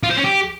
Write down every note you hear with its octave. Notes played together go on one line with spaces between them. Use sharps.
F4
C5
C#4
G4